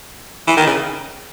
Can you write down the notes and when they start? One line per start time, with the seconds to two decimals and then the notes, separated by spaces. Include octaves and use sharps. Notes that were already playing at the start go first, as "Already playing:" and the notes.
0.47 E3
0.57 D#3
0.67 C#3